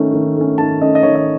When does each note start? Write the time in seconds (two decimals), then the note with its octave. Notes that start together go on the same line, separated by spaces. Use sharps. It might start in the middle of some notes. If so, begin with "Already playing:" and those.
Already playing: D#3 A3 C#4
0.14 D#3
0.37 A3 C#4
0.58 D#3 A5
0.81 A3 C#4 D#5
0.95 D#5
1.03 D#3 C#5
1.15 D#5